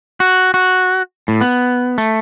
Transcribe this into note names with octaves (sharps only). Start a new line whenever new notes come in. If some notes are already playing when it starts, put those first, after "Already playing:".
F#4
F#4
A2
B3
A3